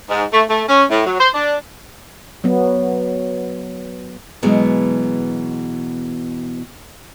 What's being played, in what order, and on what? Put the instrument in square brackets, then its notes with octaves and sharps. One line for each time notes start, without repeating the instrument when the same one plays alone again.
[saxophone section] G#2
A3
A3
C#4
A2
F#3
C5
D4
[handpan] F#3 B3
[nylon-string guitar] B2 E3 F#3 G#3 B3